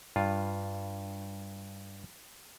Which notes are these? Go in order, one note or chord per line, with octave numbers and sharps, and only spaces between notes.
G2 F4